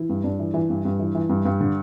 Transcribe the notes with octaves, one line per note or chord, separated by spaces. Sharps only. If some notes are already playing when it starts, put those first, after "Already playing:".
Already playing: E3 E4
G2
G2 D4
E3
E3
G2
G2
E3
E3
G2
G2
D3